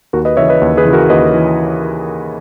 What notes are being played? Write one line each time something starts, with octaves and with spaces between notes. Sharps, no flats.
D#2 F#4 A#4
B4 D#5
C#3 E3 C#5 E5
B4 D#5
D#2
G#4 B4
C#3 E3
F#4 A#4
D#2 B4 D#5
E3